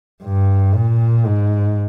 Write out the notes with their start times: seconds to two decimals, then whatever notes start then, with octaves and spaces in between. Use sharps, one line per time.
0.23 G2
0.74 A#2
1.26 G#2